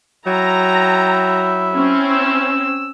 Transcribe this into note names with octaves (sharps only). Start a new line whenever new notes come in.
F#3 E4 G5 A#5
C4 C#4
E6